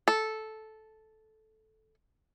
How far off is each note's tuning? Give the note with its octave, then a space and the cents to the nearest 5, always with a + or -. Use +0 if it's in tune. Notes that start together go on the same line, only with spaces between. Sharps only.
A4 -10